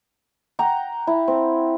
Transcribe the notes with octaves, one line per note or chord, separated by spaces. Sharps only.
F#5 G5 A#5
E4
C4